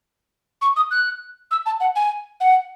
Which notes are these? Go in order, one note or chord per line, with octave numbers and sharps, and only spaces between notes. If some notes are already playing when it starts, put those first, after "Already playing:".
C#6
D#6
F#6
E6
A5
F#5
G#5
F#5